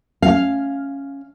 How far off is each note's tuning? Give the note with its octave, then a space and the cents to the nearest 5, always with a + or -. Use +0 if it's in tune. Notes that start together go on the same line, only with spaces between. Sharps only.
C#4 -5 F5 +0